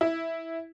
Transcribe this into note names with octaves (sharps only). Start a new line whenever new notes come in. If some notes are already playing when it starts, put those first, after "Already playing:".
E4